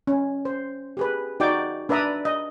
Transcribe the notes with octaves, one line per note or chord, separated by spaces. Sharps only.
C#4
C5
G4 G#4 B4
D#4 F#4 D5 G5 D6
D4 B4 D5 E5 A#5 D#6
D#5